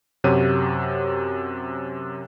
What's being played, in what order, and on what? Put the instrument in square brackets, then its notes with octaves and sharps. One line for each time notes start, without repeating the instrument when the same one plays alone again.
[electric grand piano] F#2 C3 G4 C#5 F#5 D#7